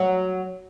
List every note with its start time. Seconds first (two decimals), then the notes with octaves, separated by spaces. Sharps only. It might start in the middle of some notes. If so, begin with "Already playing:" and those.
Already playing: F#3 F#4